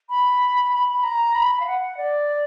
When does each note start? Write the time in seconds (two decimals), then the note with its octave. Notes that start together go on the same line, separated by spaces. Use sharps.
0.10 B5
0.73 B5
0.88 B5
1.03 A#5
1.35 B5
1.60 F5
1.66 F#5
1.97 D5